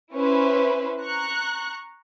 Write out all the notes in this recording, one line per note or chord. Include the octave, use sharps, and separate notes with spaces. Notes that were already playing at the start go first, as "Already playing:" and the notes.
C#4 E4 B4 C5
A#5 C#6 F#6